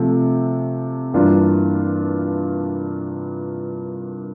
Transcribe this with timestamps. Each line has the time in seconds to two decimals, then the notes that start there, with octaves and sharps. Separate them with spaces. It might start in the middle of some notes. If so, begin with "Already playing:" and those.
Already playing: C3 F3 A3
1.14 G2 E3 A#3 D4 F4